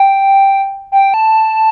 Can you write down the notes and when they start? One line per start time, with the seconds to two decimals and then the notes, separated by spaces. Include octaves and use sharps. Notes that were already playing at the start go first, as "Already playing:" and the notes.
Already playing: G5
0.92 G5
1.14 A5